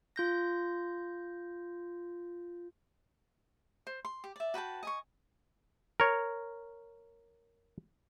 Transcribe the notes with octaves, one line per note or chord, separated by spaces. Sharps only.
F4 G6 A#6
C5
C6
G4
D5 E5
F#4 B4 G5 A5
D#5 G#5 C#6
A#4 C#5